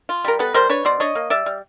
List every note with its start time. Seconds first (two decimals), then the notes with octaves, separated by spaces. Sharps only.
0.09 F4
0.24 G3 A#4
0.39 B3 A4 B4
0.54 G3 A#4 C5
0.69 D4 B4 C#5
0.85 B2 C5 D5
1.00 D4 C#5 D#5
1.15 A#3
1.30 G3 D5 E5
1.46 G3